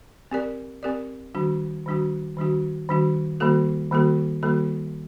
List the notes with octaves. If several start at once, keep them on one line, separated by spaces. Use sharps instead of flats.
C4 G4 A#4 D5
C4 G4 A#4 D5
D#3 G3 D4 F#4
D#3 G3 D4 F#4
D#3 G3 D4 F#4
D#3 G3 D4 F#4
D#3 G3 A#3 F#4 A4
D#3 G3 A#3 F#4 A4
D#3 G3 A#3 F#4 A4